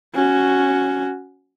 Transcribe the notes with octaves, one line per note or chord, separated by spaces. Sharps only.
C#4 F#4